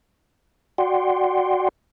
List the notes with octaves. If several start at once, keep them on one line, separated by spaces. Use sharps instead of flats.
F#4 D5 F#5 G5 C6